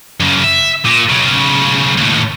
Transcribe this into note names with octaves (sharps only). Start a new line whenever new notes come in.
F#2 C#3
E5
A#2
B1 C#3
D#2 A2